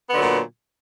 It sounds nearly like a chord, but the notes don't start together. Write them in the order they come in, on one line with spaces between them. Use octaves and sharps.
B3 D3 F#3 A#2